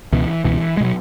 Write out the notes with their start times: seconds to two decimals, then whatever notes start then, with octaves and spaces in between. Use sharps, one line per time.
0.12 C#2 B2 E3
0.44 C#2 B2 E3
0.77 G#3
0.81 B2 F#3